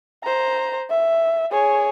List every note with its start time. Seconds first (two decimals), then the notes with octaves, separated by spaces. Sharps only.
0.24 C5 A#5
0.90 E5
1.52 G#4 C#5